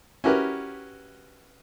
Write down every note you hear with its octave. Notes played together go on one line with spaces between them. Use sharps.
C#4 E4 F#4 G4 A#4 B4